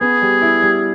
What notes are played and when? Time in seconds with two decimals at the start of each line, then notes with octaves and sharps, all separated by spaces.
0.01 B3 G#4
0.22 G3
0.42 E4
0.62 G3